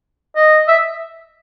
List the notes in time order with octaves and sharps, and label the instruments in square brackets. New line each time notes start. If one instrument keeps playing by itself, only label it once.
[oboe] D#5
E5